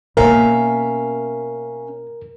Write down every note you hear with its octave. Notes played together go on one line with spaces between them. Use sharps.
B2 A#3 C#4 A#4 E5 F5